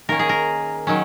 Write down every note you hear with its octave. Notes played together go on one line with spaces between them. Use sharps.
D#3 A#3 C#4 A#4
G#4
A#4
D#3 F#3 C#4